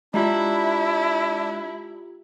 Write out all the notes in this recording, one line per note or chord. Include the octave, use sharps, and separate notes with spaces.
G#3 D4 E4 F4 G4 A#5